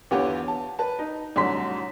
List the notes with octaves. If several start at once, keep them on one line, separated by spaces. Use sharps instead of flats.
E2 D3 B3 F4 G4 C#5
A5
B4 A5
D#4
C2 A2 D3 F#3 C6 B6